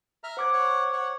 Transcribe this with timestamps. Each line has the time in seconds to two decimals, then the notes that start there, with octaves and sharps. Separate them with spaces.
0.24 E5 A#5 F6
0.37 C5 F#5 D6 G#6
0.53 C#5 F#5
0.93 C#5 F#5